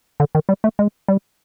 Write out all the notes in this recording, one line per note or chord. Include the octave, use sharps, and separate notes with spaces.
D3
D#3
G3
A3
G#3
G3